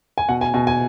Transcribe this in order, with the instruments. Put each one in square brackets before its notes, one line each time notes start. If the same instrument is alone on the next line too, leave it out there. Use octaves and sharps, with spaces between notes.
[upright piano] G#5
[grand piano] B2 [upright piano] F#5
[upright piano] G#5
[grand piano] B2 [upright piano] G#5
[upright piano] G#5